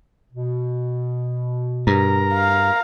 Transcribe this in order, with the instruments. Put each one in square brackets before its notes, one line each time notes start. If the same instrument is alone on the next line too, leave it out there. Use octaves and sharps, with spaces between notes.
[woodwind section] B2
[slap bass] G2 [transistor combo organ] A#4 A#5
[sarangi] F5